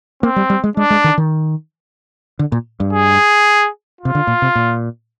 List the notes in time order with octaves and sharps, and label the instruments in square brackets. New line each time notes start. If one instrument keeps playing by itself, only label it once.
[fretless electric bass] A#3 [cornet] C4
[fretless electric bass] G3
G3
G#3
[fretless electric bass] G#3 [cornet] D4
[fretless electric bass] G#3
D#3
D#3
D3
A#2
G2
[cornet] G#4
[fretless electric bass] C3 [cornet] F4
[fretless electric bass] D3
A#2
C3
A#2